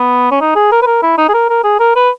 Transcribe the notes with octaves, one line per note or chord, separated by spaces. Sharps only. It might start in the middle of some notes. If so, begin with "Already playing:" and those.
Already playing: B3
C#4
D#4
G#4
A#4
B4
A#4
E4
D#4
G#4
A#4
A#4
G#4
A#4
B4